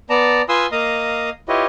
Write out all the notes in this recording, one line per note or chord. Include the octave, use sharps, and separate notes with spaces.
B3 D5 A5 A#5
F4 B4 G#5 C6 D#6 E6
A#3 D#5 F5 A#5 D#6
E4 F4 G4 B4 C#5 D#5